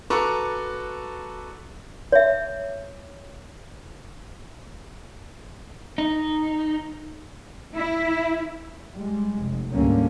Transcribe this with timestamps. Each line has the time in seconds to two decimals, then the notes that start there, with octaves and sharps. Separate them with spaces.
0.10 F#4 A4 B4 A#5 C#6 D6
2.12 C#5 E5
5.98 D#4
7.76 E4
8.94 G3 G#3
9.38 F1
9.72 D2 G#2 D3 G3 A#3 C#4